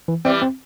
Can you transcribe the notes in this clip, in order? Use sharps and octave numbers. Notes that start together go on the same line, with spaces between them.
E3
E3 G3 C4
C4